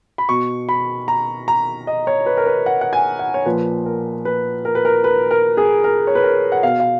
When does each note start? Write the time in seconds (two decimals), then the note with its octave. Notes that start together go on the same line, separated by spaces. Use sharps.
0.18 B5
0.29 B2 C#6
0.69 B5
1.08 A#5
1.48 A#5
1.87 D#5
2.07 C#5
2.26 B4
2.37 A#4
2.46 B4
2.66 F#5
2.81 F#5
2.93 G#5
3.19 F#5
3.34 C#5
3.46 A#2 F3 B4
3.86 A#4
4.25 B4
4.65 A#4
4.75 B4
4.85 A#4
5.04 B4
5.31 A#4
5.57 G#4
5.84 A#4
6.07 C#5
6.15 B4
6.24 A#4
6.52 F#5
6.63 B2 F5
6.80 F5